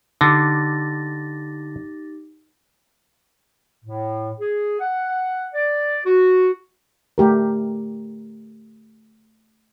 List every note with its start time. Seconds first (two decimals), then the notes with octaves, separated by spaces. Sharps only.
0.21 D3 D#4 G4 D6 A6 A#6
3.84 A2
4.39 G#4
4.80 F#5
5.54 D5
6.05 F#4
7.18 A3 G4 A#4